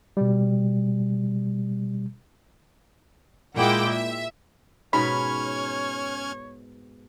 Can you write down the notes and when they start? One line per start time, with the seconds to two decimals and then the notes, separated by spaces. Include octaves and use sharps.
0.17 B2 G3
3.57 A#2 G#3 E4 F#5 G5 D6
3.90 E5
4.93 G#2 B2 C#4 C#5 B5 F6 G#6